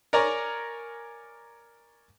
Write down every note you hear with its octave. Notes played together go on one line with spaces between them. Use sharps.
A#4 C#5 D5 G#5 A#5 C#6